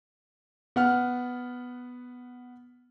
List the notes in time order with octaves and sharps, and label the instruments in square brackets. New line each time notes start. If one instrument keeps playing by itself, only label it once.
[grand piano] B3 F#5 F6